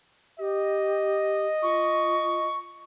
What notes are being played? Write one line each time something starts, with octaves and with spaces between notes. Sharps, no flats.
G4 D#5
F4 C#6